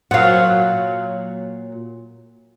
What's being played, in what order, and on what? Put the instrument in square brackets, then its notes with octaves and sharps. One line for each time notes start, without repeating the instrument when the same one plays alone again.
[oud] A#2 F#3 [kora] F5 F#5